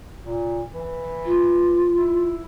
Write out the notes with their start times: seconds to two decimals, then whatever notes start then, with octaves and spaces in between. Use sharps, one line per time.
0.24 A#2
0.73 E3
1.25 F4
1.98 E4